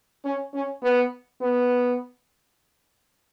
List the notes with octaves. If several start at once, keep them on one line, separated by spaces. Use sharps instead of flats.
C#4
C#4
B3
B3